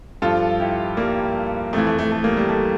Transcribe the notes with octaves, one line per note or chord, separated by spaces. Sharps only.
G2 F3 F4 A4
E4 G4
G3 A#3
F2 E3 A3
A3
A3
A3
G3 A#3
G3
A3